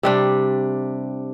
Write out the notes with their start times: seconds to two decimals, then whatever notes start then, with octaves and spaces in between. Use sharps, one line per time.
0.03 C3 G3 D4